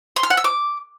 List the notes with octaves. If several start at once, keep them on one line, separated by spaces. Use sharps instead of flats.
C6
F6
F#5
E6
D6